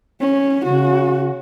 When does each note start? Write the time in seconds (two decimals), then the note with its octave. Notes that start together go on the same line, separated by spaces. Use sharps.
0.20 C#4
0.64 C#3 F#4